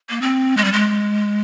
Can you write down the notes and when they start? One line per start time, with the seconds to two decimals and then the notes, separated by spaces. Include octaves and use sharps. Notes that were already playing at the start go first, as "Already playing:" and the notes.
0.10 A#3
0.22 C4
0.57 G#3
0.64 G3
0.73 G#3